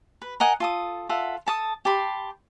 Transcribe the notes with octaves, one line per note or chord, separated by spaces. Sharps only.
B4
A#4 D#5 F#5 G#5
F4 A4 D#6
F4 A4 E5 F#5
A4 A5 D#6
G4 A5 B5 C6